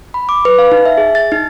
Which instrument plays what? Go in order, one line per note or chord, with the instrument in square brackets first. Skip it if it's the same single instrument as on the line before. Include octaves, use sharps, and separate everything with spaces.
[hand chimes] B5
D6
B4
F5
D#4
E5
G#4
A6
D#4